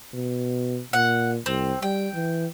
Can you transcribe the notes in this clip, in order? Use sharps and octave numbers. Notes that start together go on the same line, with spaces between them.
B2
A#2 F#5
C2 C4
G3 G5
E3